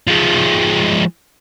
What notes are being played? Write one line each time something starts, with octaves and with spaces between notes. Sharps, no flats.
F3 G#3